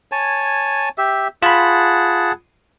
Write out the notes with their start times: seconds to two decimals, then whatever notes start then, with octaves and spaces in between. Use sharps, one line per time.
0.12 C#5 G#5 A5
0.98 G4 E5
1.42 F4 G#4 F#5 A5 B5